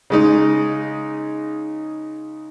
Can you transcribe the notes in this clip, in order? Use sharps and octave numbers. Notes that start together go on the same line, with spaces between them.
C#3 G#3 D#4